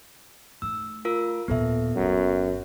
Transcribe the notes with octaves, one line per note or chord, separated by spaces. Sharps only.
A3 D#4 E6
F4 A#4 E6
D#2 A#2 B3 A4 E5
G1 F#2